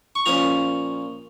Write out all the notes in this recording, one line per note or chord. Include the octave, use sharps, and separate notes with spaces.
C#6
A#2 F3 C#4 A#5